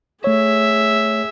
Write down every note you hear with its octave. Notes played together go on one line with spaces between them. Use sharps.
A3 G#4 C#5 E5